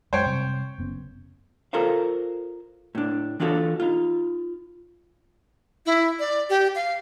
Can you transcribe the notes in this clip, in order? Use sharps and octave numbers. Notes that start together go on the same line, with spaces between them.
F#2 G#3 C5 C#5 G5
C3 G3
F#1 B3 C#4
F4 A4 A#4 C5 F5
A2 D4
E3 D4 F4 F#4 A4
D#4 F4
E4
D5
G4
F5